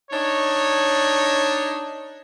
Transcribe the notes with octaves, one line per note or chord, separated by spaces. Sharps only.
D4 D#4 C#5